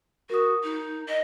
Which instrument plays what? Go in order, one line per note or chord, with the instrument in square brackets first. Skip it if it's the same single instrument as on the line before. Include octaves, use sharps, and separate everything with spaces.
[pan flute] F#4 [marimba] A#4 D#6
[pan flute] D#4
D#5